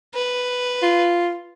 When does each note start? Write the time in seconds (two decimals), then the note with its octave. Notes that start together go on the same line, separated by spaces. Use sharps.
0.15 B4
0.82 F4